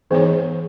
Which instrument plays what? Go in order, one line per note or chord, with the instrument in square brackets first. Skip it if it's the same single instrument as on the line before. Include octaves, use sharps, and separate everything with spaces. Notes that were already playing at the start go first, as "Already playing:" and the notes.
[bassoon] G#2 [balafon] E3 B3 G#4 C#5